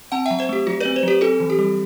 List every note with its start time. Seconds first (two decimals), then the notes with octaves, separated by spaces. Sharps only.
0.12 C4 F#5 A5
0.25 E5 G5
0.31 F#3
0.39 C5 E5
0.49 A3 G4
0.67 F#3 F#4
0.80 C4 B4 D5
0.96 C5
1.03 F#3 G4 B4
1.21 C4 F#4 A4
1.40 E3
1.50 G4
1.59 G3